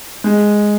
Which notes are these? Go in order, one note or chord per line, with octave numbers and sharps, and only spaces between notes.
G#3